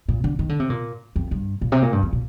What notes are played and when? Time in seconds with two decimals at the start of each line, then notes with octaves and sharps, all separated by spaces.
0.09 A#2
0.24 D3
0.39 D#3
0.49 D3
0.60 C3
0.70 A#2
1.16 F2
1.31 G2
1.61 A#2
1.72 C3
1.82 A#2
1.92 G2
2.03 F2
2.13 A#2